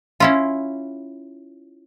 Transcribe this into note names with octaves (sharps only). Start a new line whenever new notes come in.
C#4 E4 F4